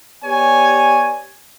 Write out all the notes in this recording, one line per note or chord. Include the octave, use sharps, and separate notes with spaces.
B3 G4 C#5 D5 G#5